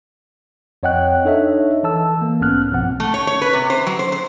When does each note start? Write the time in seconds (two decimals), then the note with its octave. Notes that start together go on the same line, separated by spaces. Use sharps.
0.83 F2 C#5 D#5 F#5 G5 F#6
1.25 D4 D#4 A4 C#5 D#5 E5
1.83 E3 A4 A5 E6
2.17 E3 A#3
2.40 B1 G#2 B3 C#4 F6 F#6
2.71 A#1 G2 B2 F3 C4 F#5
3.00 A3
3.14 C#5
3.27 C#5
3.41 B4
3.53 C3
3.70 C5
3.87 F#3
3.99 C5
4.12 C5